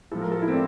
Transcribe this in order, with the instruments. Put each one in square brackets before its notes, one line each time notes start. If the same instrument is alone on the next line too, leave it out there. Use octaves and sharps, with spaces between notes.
[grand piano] A2 F3 A4
A#4
A4
E4
C4
D4